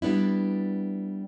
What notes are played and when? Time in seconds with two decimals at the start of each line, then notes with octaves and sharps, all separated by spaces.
0.02 G3 B3 D4 E4